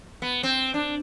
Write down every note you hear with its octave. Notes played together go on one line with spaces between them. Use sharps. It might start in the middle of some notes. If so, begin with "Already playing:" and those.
B3
C4
D4